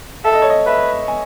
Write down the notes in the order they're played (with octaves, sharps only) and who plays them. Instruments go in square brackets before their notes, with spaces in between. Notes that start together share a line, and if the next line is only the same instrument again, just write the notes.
[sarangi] A4 [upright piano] E5
[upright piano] D#5
C#5
D#5
[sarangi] B4 [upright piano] E5
[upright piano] G#5